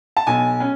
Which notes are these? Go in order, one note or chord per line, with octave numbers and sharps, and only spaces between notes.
A5
B1 G#5
C#4